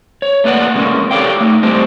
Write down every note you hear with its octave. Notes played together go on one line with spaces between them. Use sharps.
C#5
A3 A#3 B4 D5 F#5
C3 G#3 A#3 C#4
G4 A4 C#5 D5 F5 G5
A3 D#4
G3 C4 D4 G4 C5 D#5